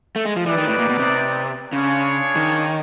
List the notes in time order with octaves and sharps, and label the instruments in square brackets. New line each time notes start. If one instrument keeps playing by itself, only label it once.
[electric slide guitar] A3
G#3
F3
[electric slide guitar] E3 [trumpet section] D#4 G4 B4 D5
[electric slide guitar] D#3
A2
A#2
B2
C3
[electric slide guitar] C#3 [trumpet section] D4 F4 G#4 C#5
[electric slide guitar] D#3